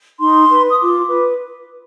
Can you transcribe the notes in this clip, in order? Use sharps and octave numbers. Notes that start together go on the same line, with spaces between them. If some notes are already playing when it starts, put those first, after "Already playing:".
D#4 C6
B4
D#6
F4 D6
B4